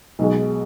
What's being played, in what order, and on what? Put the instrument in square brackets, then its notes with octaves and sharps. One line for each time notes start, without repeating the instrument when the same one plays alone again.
[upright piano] B1 B2 G#3